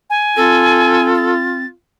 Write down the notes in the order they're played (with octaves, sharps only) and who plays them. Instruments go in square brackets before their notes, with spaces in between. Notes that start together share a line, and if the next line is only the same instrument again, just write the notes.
[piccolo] G#5
[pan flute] C4 [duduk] F4 [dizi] A4
[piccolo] A6